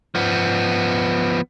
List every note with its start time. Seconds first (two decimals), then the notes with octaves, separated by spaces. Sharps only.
0.15 F3 B3